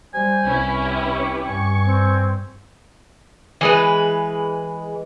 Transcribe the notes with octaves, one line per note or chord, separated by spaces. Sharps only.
G3 C5 G#5
C2 C#4 E4 B4
G4
C#6
G2 G#5 C#6
C4
E3 G#3 B4